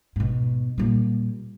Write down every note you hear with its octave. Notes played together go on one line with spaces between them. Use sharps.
G#2 B2
A#2 G3